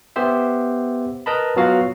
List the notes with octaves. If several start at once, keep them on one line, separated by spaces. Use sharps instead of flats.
B3 G4 C5 E5
A#4 B4 D#5 A5 B5
F#3 B3 F4 F#4 F5